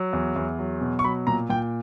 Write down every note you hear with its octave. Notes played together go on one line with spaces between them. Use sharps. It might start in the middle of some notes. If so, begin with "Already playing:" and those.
Already playing: F#3
E2
E2
F#3
B2
C#6
F#3 B5
A#2 A#5
A#2 G5